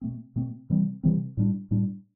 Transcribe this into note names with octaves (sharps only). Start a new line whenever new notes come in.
B2 A3 C4
B2 A3 C4
C3 E3 G3 C4
C3 E3 G3 C4
A2 G3 D4
A2 G3 D4